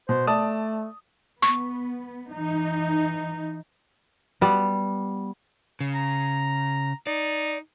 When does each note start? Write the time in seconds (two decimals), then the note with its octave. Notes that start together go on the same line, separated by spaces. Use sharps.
0.09 B2 C5
0.27 A3 D5 A5 D#6
1.42 B3 C#6
2.33 E3 D#4
4.41 G3 B3
5.81 C#3
5.94 A#5
7.07 D#4 D5